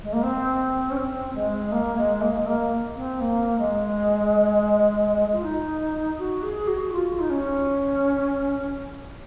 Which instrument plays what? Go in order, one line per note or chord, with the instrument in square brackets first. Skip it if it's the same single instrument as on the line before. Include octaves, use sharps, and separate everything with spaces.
[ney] G#3
A#3
C4
C#4
C4
G#3
A#3
G#3
A#3
G#3
A#3
C4
A#3
G#3
F4
D#4
F#4
G#4
F#4
F4
D#4
C#4